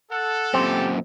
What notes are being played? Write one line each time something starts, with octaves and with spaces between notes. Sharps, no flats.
A4 F#5
F#2 A#2 C4 G4